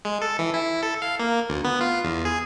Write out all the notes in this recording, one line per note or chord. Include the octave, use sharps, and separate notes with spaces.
G#3
A4
E3
E4
A4
F5
A#3
D2
B3
F4
E2
G#4